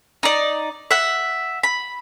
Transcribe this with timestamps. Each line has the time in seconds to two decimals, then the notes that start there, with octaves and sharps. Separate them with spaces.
0.23 D#4 D5
0.91 E5 F#5
1.63 B5